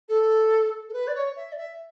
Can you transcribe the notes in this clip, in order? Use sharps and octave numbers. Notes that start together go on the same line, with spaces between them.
A4
A4
B4
D5
C#5
E5
D5
E5